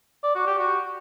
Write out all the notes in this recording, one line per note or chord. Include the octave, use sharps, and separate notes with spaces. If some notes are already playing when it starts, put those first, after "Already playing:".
D5
F#4
G4
F#4